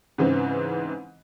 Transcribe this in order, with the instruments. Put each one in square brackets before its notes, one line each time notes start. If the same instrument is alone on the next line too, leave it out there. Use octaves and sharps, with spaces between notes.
[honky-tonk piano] G#2 C#3 E3 C4